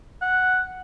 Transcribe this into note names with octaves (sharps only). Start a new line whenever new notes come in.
F#5